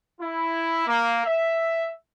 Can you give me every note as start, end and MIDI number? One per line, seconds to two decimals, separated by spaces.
0.20 0.87 64
0.87 1.23 58
1.24 1.91 76